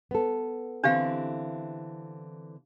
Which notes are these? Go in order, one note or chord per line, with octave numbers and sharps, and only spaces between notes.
B3 A4
D3 E3 C4 D4 G4 F5